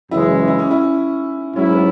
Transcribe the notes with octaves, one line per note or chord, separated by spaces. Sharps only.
F#2 C#3 E3 G#3 E4
E4
C#4
E4
G#2 F#3 C#4 E4
B3